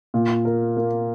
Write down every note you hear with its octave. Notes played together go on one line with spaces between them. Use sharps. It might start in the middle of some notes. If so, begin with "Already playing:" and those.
A#2
A#4
A#3